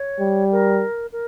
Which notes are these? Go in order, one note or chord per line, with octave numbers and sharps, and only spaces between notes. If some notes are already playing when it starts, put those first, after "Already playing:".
Already playing: C#5
G3
A#4
A#4